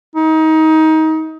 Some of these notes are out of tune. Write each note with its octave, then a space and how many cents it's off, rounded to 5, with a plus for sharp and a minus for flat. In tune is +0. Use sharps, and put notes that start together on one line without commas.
D#4 +25